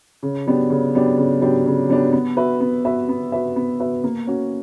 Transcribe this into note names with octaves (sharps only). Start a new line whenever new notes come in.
C#3
F#3 B3 D4 G4
C#3
F#3 B3 D4 G4
C#3
F#3 B3 D4 G4
C#3
F#3 B3 D4 G4
B3
F#4 B4 E5
B3
F#4 B4 E5
B3
F#4 B4 E5
B3
F#4 B4 E5
A#3
C#4 F#4